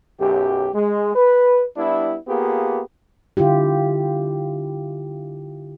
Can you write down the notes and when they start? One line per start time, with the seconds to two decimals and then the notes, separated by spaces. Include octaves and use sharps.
0.19 B1 F#2 G4
0.74 G#3
1.15 B4
1.77 G3 B3 D4 E4
2.27 A#3 B3 F4 G4 G#4
3.37 D3 E4 F4 G4